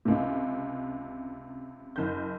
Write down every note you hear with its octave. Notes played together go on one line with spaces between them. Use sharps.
C#2 C3
F#1 G6